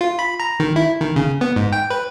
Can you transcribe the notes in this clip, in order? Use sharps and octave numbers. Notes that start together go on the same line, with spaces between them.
F4
B5
A#5
D#3
E4
D#3
C#3
B3
G#2
G5
B4